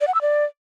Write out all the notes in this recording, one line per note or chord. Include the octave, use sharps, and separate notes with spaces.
D5
F#5
E6
D5